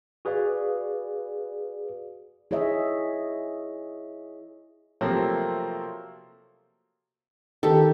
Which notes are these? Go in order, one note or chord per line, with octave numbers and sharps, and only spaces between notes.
F#4 G#4 B4 D5 F5
E4 G#4 C#5 D#5 E5
C3 F3 F#3 A3 A#3 C4
D#3 G4 A4